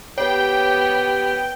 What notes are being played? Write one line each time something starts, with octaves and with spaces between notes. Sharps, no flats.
B3 G4 C#5 G5